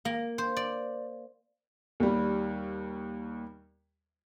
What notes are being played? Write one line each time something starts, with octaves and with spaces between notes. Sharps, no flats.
A#3
C5
D5
D#2 G3